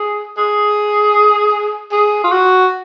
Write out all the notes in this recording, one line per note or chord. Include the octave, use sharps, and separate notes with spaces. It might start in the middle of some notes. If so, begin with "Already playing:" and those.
Already playing: G#4
G#4
G#4
F4
F#4